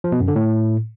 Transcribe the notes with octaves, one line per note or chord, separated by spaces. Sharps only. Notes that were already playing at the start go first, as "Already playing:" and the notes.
F3
B2
F#2
D3
A2